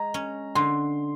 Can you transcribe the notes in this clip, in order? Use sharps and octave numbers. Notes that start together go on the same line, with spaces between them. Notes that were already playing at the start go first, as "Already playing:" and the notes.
Already playing: G#3 A#5
C#4
D3 C6